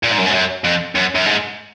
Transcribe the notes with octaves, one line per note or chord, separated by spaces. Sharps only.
A#2
G#2
F#2
G#2
F#2
F2
F#2
F#2
G#2